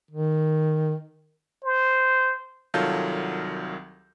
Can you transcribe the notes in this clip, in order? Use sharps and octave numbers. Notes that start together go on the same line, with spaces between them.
D#3
C5
C2 D#3 F#3 F4 A4 G6